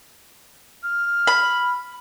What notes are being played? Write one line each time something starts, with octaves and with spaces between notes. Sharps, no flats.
F6
B5